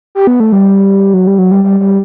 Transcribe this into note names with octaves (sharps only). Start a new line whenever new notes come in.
G4
B3
A3
G3
F#3
G3
F#3
G3
G3
G3